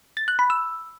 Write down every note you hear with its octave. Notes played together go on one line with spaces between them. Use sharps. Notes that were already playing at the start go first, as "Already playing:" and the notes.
A6
F#6
B5
E6